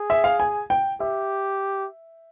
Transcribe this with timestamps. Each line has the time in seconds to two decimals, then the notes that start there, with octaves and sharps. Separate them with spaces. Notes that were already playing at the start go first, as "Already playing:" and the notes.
Already playing: G#4
0.10 E5
0.24 F5
0.40 G#5
0.70 G5
1.00 G4 E5